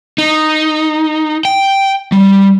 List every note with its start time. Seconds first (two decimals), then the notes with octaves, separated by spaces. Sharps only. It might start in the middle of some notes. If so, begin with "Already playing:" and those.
0.18 D#4
1.45 G5
2.12 G3